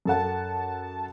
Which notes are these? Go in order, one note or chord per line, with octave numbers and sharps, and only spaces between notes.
F#2 A4 F#5 A5